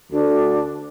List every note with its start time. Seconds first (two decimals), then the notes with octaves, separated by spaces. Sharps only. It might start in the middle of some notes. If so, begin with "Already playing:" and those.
0.12 D2 D4